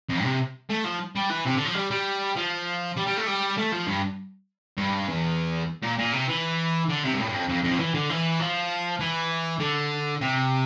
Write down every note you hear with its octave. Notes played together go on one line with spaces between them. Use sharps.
F2
C3
A3
F3
G3
E3
C3
D3
F3
G3
G3
F3
G3
G3
A3
G3
A3
F3
G2
G2
E2
A#2
A#2
C3
E3
D3
C3
G2
A2
G2
F2
F2
F2
F3
E3
D3
E3
F3
E3
D3
C3